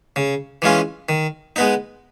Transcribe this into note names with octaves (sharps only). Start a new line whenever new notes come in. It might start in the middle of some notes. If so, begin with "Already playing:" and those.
C#3
E3 G#3 C#4 F4
D#3
G#3 B3 D#4